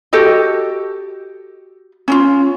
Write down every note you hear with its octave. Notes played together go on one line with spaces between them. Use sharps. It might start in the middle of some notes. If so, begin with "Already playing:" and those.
F#4 G4 A4 D#5
C#4 E4 F4